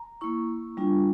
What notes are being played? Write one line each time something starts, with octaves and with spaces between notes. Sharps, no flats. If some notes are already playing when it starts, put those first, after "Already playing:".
Already playing: A#5
A#3 E4 C#6
G3 D4 F4